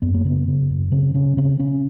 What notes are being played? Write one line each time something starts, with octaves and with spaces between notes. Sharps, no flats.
F#2 B3
A#3
C#3 B3
C#3
F#2
C#3 C4
C#3 C#4
C#3 C4
C#3 C#4